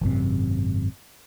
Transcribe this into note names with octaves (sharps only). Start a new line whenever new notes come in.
G#1 F#2 A2 C3